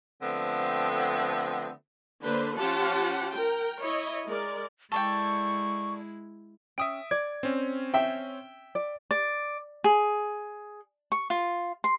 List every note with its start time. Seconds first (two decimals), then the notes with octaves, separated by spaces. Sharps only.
0.22 D3 F3 A3 B3 C4
2.24 D3 A#3 D4 B4 C5
2.58 F3 C#4 F4 G4 F#5 A5
3.32 A#4 G5
3.83 E4 C#5 D#5
4.26 G#3 A#4 D5
4.92 G#3 E4 A4 D5 G5 C#6
6.78 C#4 E5 G5 D#6 D7
7.11 D5 G#6
7.43 C4 C#4
7.94 E5 G5
8.75 D5
9.11 D5
9.84 G#4
11.12 C#6
11.30 F4
11.84 C6